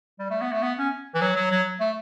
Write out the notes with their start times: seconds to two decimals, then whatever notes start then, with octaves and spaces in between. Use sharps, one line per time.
0.19 G3
0.30 A3
0.41 B3
0.52 A3
0.63 B3
0.78 C#4
1.15 E3
1.21 F#3
1.36 F#3
1.51 F#3
1.80 A3